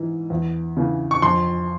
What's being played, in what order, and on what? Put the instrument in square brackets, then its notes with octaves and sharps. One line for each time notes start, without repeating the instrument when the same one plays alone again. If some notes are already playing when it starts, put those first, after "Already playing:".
Already playing: [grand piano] G#2 E3
E2
C#3 E3
C#6
F2 C6